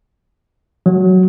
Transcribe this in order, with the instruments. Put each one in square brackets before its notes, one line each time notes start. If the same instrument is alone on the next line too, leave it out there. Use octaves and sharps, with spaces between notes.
[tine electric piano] F#3